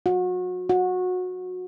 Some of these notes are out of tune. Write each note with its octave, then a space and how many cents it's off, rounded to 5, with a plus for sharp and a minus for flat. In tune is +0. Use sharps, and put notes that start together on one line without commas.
F#4 -30
F#4 -20